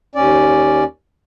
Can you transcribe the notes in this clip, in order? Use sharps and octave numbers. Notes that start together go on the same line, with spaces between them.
D#2 C#4 D5